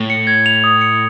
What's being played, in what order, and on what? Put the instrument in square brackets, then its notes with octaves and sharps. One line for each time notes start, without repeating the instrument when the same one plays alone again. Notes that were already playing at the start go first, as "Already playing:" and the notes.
Already playing: [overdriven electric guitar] A2
[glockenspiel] C#7
G#6
F7
D#6
C#7